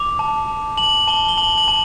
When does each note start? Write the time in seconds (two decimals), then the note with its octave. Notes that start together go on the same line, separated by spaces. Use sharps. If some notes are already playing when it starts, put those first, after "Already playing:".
Already playing: D6 F7
0.19 A5
0.48 A5
0.77 A5 F#7
1.08 A5 G7
1.28 G7
1.38 A5 F#7
1.58 F#7
1.68 A5